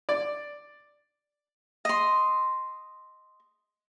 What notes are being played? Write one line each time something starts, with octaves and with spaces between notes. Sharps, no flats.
D5
D#5 C6